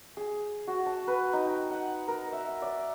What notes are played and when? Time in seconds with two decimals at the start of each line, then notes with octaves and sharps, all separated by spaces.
0.17 G#4
0.67 F#4
0.86 A5
1.07 B4
1.33 D#4
1.45 G5
1.70 F#5
2.08 A#4
2.32 E5
2.62 D5